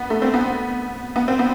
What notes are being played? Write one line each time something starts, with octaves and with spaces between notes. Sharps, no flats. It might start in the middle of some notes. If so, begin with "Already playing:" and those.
Already playing: B3
A3
C4
B3
B3
C4
B3